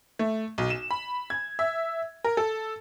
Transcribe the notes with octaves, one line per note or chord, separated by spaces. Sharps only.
A3
B1
E7
B5
G#6
E5
A#4
A4